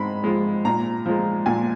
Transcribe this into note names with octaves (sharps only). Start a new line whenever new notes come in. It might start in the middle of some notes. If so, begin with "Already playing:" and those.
Already playing: G#2 G#3 B5
F3 G#3
A#2 A#5
F3 G#3
A#2 G#5